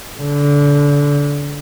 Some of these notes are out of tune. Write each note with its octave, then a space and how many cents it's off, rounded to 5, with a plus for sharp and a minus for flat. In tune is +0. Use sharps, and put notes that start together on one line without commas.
D3 -25